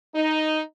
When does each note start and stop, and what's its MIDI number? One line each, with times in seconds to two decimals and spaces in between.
0.15 0.62 63